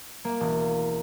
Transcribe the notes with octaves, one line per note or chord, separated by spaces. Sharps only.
A#3
E1